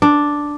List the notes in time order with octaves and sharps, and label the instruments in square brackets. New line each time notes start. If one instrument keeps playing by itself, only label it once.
[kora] D4